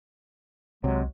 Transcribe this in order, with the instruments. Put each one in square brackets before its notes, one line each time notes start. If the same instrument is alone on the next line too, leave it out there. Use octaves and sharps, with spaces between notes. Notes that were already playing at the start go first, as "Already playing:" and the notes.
[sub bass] C2 [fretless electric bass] C3 [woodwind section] F#3 G#3